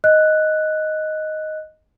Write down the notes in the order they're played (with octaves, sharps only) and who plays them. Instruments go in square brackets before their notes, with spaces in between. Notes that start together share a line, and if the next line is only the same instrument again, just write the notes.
[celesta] D#5 F#6